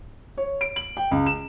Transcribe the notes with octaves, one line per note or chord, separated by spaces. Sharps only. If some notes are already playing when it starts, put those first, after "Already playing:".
C#5
D7
F#7
G5
C#2
E7